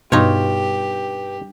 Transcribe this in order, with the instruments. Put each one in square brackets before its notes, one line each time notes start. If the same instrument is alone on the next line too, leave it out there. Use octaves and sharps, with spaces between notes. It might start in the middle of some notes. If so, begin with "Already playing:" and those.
[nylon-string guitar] G2 [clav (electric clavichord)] B2 [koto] D#4 F4 C#5 [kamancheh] G4